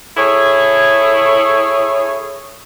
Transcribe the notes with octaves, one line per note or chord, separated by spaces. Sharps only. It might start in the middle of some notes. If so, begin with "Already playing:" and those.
E4 G#4 A4 C#5